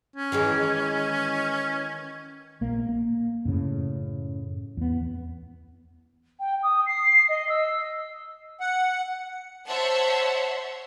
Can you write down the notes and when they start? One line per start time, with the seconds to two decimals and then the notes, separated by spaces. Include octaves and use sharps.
0.16 C#4
0.32 D#3 E3 G#3
2.61 A#1 A#3
2.89 A#3
3.45 F#2 A2 C#3
4.77 E2 B3
6.40 G5
6.63 D#6
6.86 C7
7.29 D#5
7.49 E6
8.60 F#5
9.67 C5 C#5 E5 F#5 A5 C6